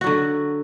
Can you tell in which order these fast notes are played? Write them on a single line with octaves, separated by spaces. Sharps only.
F#4 F#3 D3